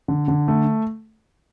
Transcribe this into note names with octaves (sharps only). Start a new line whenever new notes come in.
D3
D3
A3